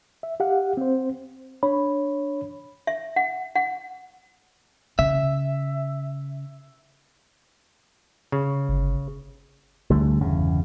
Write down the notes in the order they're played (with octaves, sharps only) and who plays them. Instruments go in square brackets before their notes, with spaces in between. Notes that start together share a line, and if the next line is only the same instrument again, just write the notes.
[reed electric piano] E5
G4 F5 F#5
C4 C5
[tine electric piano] D4 C#5 B5
[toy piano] E5
F#5
F#5
[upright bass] C#3 [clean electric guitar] E5
[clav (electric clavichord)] C#3
[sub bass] G1
[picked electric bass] D2 D3 G3 A3
G1 E2 C#3